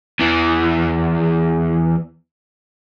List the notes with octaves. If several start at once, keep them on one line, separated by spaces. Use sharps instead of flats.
E2 E3